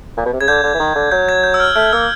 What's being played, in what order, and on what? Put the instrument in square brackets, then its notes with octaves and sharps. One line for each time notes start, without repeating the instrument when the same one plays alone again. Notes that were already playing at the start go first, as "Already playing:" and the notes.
[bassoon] A#2
B2
C3
[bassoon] C#3 [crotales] G#6
[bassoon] D3 [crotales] G6
[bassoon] D3
E3
D#3
D3
[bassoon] F#3 [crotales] G6
[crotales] G#6
G6
E6
F6
[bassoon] A3 [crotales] F6
[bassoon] A#3 [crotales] E6